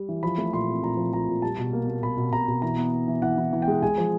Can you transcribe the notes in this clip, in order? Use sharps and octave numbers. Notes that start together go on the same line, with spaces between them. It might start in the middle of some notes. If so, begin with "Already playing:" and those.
Already playing: G3
E3
F3 B5
A3
A#2 C6
C4
A#2 A#5
F3
F3 A#5
A#2
G3 A5
B2
A#3
A#3
B2 B5
B2
B2 A#5
B2
E3 A#5
B3
B3
E3
E3 F#5
E3
E3
G5
G#3
G#3 G#5
F3